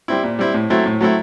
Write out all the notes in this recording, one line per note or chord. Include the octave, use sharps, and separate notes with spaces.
G3 C4 E4
A#2
G3 C4 E4
A2
F#3 A3 C4 E4
A2
F#3 A3 C4 E4